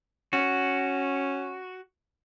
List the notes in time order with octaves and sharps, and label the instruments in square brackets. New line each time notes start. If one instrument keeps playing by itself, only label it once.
[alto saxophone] C#4 [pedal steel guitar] F#4